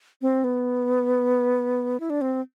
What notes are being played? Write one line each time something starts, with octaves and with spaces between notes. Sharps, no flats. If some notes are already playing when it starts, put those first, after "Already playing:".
C4
B3
E4
D4
C4